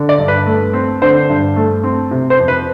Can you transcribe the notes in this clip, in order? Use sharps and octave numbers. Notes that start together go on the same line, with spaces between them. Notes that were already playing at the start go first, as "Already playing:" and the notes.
Already playing: D3
D5
G2
B4
A3
C4
D3 C5
G2
A3
C4
C3
C5
F2
B4